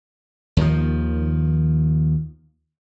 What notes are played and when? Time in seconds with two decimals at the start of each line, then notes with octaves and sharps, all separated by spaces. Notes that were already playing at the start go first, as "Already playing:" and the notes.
0.57 D#2 D#3 F3